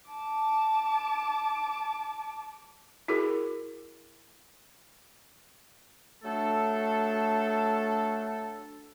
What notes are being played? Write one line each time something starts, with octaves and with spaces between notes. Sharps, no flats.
A5 D6
E4 F#4 G#4 A#4
F#3 A3 D4 A4